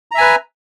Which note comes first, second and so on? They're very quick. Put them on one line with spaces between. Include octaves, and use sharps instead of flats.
A#5 E5 G#5 B4